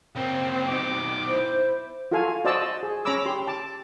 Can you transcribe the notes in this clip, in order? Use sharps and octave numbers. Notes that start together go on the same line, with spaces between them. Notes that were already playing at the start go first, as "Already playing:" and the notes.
C#3 A#3 C4
B2 D#3 D6
E4 C5
F4 F#4 A4 F5 G#5
F#4 C5 D5 D#5 A5 E6
G#4
C#4 C#5 A#5 B5 D6 E6
G4 C6
A5 D6